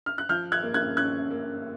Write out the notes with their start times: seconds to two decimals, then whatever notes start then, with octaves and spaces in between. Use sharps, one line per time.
0.06 F6
0.18 F#6
0.29 F3 F6 G6
0.52 F#6 G#6
0.63 A#3
0.74 F#6 G#6
0.97 C#4 F#6 G#6
1.31 A#3